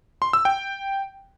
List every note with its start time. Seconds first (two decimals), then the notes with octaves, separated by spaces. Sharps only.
0.22 C6
0.33 E6
0.45 G5